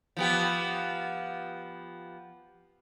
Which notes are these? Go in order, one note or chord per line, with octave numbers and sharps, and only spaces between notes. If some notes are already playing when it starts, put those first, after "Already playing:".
F3 B3 G4